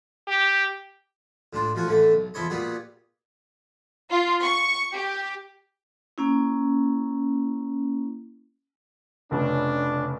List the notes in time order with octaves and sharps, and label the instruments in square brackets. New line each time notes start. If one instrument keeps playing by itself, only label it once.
[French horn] G4
[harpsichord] A2 D4 F4
A1 F3 F4 F#4 G#5
D3 E3 A3 A4
B1
E2 F3 E4 C#5 D#5
A#2 G3 B3 F#4 G#4
[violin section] F4
C#6
G4
[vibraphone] A#3 C#4 E4
[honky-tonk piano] F1 C#3 [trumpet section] D4